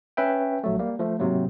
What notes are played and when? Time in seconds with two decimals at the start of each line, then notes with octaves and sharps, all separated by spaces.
0.17 C#4 B4 E5 G5
0.64 A#1 F#3 A3
0.79 G3 A#3
0.99 F3 A3
1.19 G#2 C3 F#3 A#3